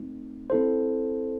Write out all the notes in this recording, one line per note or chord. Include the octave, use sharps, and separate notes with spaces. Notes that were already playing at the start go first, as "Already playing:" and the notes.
Already playing: A3 C4 D#4
C4 E4 A4 C5